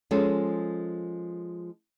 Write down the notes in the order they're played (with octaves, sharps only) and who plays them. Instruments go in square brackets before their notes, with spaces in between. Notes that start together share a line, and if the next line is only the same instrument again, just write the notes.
[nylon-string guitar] F3 G#3 C#4 G#4 A4